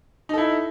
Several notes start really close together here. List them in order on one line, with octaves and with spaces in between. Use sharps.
D#4 A4 E4